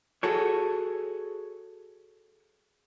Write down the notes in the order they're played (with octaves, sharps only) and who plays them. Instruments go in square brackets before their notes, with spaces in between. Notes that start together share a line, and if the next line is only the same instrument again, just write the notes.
[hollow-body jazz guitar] F#4 G#4 A4 C#5